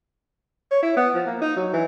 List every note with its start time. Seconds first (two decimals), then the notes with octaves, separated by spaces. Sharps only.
0.71 C#5
0.83 E4
0.97 B3
1.14 F3
1.26 A#3
1.41 D#4
1.56 F#3
1.73 E3